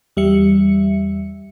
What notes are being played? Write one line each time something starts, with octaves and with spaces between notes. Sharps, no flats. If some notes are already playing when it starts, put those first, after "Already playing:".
E2 G3 E5 C#7